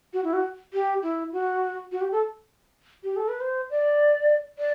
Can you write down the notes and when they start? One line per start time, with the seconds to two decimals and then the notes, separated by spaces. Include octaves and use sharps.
0.13 F#4
0.24 E4
0.33 F#4
0.73 G4
1.03 E4
1.33 F#4
1.92 F#4
2.01 G4
2.12 A4
3.04 G4
3.17 A4
3.29 B4
3.40 C5
3.70 D5
4.59 D5